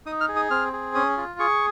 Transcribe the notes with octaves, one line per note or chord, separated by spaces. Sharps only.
D#4 D#6
F6
G#4
D#6
C4 F6
G#4
C#4 D#6
F4
G#4 C#6